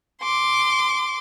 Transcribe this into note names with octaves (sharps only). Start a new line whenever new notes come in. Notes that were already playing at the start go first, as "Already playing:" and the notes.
C6 D6